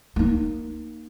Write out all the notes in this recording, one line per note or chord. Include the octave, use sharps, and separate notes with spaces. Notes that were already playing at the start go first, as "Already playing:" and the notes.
A#3 D#4